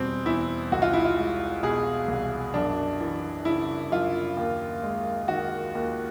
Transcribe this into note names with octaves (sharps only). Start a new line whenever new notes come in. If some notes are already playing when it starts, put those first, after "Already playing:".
Already playing: E2 B2 G3 C4
E2 E4
C2 F#4
F4
E4
F4
G#3
B2 G#4
C2
F#2 D4
E3
C#3 E4
F#2 F4
D#2
G#3
D#3 F#4
D#2